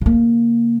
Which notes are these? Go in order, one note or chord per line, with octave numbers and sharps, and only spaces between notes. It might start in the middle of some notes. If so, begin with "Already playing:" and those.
C#3 A#3